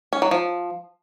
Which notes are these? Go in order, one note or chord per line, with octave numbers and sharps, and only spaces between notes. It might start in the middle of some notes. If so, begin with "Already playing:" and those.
C#4
F#3
F3